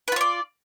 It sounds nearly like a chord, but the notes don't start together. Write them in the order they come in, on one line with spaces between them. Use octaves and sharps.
B4 F4 C#5 D5